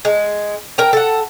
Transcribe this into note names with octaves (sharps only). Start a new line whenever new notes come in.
G#3
A#4 G5 A#5
A4 F#5